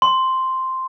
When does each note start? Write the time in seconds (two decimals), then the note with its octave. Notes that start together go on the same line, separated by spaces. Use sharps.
0.02 C6